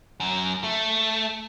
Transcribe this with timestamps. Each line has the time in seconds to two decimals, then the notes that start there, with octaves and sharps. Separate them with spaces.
0.20 F#2
0.64 A3